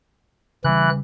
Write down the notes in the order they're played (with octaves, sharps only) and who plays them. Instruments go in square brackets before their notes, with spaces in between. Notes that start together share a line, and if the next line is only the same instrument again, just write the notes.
[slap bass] C#3 G3 [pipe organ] E3 F#6